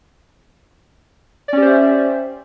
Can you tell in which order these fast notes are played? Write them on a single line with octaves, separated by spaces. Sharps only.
D5 C#4 G4 C5 E5